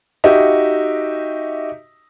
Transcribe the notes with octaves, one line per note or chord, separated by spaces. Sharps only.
D#4 F#4 G4 D#5 E5